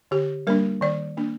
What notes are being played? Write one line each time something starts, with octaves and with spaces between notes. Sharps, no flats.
D3 G4
G3 A#3 D4 A#4
D#3 D5
A#3 D4